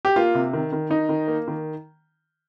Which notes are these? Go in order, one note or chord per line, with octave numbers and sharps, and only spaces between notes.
G4
A#3 F4
C3
D#3
D#3
D#3 D#4
D#3
A#3
D#3